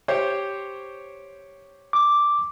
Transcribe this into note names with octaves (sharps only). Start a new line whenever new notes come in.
G4 C5 C#5
D6